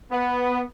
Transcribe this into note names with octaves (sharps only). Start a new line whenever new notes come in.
B3